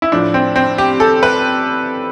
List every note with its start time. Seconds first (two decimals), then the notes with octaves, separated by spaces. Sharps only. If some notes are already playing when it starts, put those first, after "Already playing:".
0.02 E4
0.12 A2 F3 D4
0.34 C4
0.56 C4
0.78 G4
1.00 A4
1.23 B4